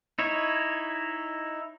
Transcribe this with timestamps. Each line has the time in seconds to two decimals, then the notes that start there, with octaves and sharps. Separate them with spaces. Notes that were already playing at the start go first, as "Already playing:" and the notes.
0.19 D#4 E4 C#5